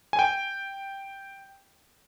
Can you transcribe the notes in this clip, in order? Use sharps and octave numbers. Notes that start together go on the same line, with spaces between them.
G#5
G5